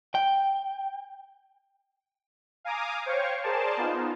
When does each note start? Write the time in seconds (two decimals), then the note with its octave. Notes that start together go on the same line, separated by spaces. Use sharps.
0.15 G5
2.64 F5 G#5 A#5 D6 D#6
3.06 C5 C#5 F5 G5 C#6
3.43 G#4 A#4 C5 D5 A5
3.77 B3 D#4 F4